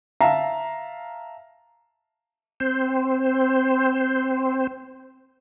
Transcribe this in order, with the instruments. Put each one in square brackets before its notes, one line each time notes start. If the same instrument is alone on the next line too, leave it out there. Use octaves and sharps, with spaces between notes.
[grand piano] E5 F5 A5 A#5
[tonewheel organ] C4 C5